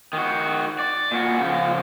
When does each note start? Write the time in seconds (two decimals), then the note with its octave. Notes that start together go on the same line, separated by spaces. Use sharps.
0.13 D#3 F#4
0.79 D5
1.11 A#2 F#4
1.40 C#3 F3